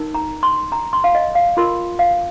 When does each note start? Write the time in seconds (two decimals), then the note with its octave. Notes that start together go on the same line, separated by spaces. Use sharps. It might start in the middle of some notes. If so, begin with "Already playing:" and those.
Already playing: D#4 A#4
0.15 A#5
0.43 C6
0.72 A#5
0.93 C6
1.04 F5
1.15 D#5
1.35 F5
1.57 F4 A#4 C6
1.99 F5